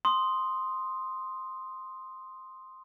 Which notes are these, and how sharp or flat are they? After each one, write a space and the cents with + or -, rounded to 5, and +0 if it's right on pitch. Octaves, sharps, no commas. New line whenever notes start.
C6 +0 D#6 +0